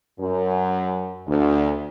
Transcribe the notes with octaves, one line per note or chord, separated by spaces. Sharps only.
F#2
D2